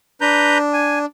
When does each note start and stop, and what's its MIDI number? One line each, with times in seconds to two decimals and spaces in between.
0.21 1.06 62
0.21 0.58 71
0.21 0.58 82
0.21 0.58 91
0.73 0.99 80